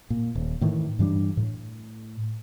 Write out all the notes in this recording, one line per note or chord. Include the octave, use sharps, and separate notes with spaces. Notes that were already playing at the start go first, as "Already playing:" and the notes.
A#2
D#1
A2 D#3 E3
G2 E3 G3 D4
A2